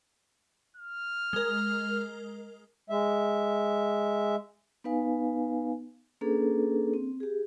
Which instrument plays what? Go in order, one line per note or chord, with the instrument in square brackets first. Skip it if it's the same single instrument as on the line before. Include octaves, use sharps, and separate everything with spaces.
[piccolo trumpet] F6
[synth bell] G#3 A#4
[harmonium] G#3 E5
[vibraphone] B3 D#4 B4 F5 G#5
A#3 C#4 D4 G#4 A4 B4
C4
G4 G#4